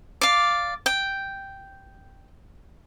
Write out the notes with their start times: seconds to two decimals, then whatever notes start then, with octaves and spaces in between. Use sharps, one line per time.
0.21 D5 F5
0.86 G5